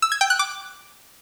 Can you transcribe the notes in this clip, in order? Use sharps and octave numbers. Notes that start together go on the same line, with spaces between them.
E6
G#6
G5
F#6
D6